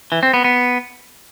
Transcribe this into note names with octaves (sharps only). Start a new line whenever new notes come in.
E3
C4
B3
B3